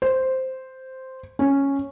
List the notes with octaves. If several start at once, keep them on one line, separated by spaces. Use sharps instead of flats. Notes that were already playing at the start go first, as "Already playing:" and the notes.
C5
C#4